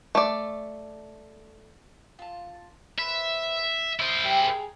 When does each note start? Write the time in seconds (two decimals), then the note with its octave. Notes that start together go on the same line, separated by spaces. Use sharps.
0.15 A3 D5
2.19 F4 A5
2.98 B4 C5 E5 B5
4.00 E4 C5 C6
4.23 G4 E5 G#5
4.42 G#4 A#4